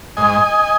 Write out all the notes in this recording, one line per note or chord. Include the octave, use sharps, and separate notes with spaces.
G#2 D#5 G#5